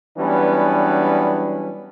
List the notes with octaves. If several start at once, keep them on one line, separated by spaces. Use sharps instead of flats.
E3 F#3 G3 B3 C#4 D4